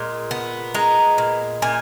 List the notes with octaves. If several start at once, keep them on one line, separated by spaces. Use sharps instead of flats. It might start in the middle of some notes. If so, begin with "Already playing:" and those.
Already playing: A#2 G#3
B3
G#3 A#5
A#2
A#2 G#5